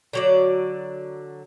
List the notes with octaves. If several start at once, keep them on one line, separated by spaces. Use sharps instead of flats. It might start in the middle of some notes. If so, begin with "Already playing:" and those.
D3 F#3 D5